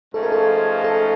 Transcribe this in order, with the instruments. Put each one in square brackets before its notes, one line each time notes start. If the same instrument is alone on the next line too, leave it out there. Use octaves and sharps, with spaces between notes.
[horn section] G#2 F3 A3 C#4 F4 [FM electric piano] A4
[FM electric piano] A#4
A4
A4